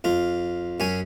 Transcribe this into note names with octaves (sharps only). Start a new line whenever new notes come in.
F2 F4
F#2 C#4 G#5